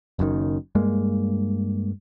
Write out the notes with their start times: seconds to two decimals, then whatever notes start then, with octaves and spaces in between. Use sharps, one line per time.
0.19 F#1 F#2 A2 D#3
0.75 G2 G#3 A#3